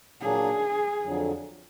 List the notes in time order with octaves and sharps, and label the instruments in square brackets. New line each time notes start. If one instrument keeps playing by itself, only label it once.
[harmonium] A#2 F#3 A#3 D4 [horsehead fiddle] G#4
[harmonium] F2 D3 F#3